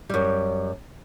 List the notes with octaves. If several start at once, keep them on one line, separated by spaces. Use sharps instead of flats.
F#2 G3